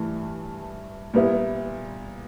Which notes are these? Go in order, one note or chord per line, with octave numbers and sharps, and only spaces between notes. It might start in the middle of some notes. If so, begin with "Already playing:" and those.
Already playing: G2 E3 A3
A#2 G3 B3 E4